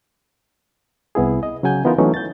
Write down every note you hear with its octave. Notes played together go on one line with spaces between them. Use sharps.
C2 B3 E4 G#4
D#5
C#3 F#3 F#5 G#5 G6
E3 B3 D#4 F4 A#4
E3 F#3 A3 B3 C#4 D#4
G6 A6